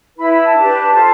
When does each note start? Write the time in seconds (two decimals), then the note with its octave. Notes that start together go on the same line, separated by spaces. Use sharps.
0.17 E4 B4 B5
0.30 B5
0.43 A5
0.56 D4 G4 B4
0.94 F4 A4 C5